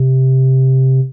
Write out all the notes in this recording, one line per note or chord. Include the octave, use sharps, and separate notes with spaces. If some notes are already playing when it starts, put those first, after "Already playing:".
Already playing: C3